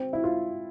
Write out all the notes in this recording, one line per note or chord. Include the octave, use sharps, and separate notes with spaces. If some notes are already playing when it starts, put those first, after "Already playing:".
Already playing: C4
E4
F4